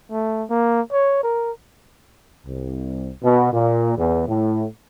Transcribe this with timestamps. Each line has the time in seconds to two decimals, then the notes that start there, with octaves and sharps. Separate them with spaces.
0.12 A3
0.50 A#3
0.93 C#5
1.23 A#4
2.45 C2
3.22 B2
3.52 A#2
3.96 E2
4.27 A2